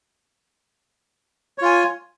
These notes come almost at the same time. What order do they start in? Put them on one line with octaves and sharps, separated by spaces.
C#5 F4 G#5